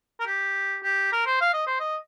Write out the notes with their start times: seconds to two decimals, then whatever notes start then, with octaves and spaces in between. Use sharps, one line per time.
0.20 A#4
0.26 G4
0.83 G4
1.12 A#4
1.26 C5
1.41 F5
1.53 D#5
1.67 C5
1.80 D#5